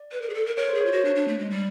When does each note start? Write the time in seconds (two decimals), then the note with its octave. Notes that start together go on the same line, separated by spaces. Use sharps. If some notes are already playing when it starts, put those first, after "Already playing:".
Already playing: D5
0.12 B4
0.22 A#4
0.30 G#4
0.34 A4
0.46 A#4
0.57 A#4 C#5
0.68 C5
0.75 G#4
0.81 C#5
0.86 F4
0.92 F#4
1.05 D4
1.16 D4
1.28 A3
1.39 G#3
1.50 G3